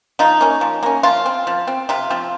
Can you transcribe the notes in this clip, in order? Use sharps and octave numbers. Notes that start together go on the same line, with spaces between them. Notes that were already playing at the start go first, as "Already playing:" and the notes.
F3 D#4
A#3 C#4
F3
A#3 C#4
F3 F4
C4
F3
C4
C3 F4
F3 C4